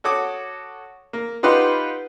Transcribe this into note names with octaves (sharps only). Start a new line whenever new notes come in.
F#4 A4 C#5 D6 D#6
A#3
D#4 F4 G4 B4 F#5 C6